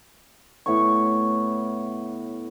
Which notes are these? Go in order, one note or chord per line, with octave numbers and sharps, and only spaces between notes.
A2 B3 C#5 C#6